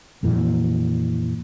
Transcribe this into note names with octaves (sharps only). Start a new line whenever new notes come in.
F2 A#2 E3